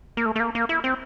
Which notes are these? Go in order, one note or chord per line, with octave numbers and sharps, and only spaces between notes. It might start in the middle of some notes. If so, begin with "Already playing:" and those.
A#3
A3
A3
A#3
A#3
E4
C4